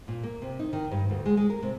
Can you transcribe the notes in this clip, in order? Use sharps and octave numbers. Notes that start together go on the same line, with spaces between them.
A#2
A#3
C3
D#4
D#3
G2
D2
G#3
G#3
A#4
C3